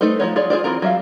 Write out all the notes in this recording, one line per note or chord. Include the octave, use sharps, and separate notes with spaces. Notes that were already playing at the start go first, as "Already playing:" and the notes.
A3 D#4 A4 B4 C5
F3 F#3 D#4 C#5
F4 G#4 C#5 D5
F4 G#4 C5 D5
E3 C4 F4 A#4 A#5
F#3 G3 E5 F5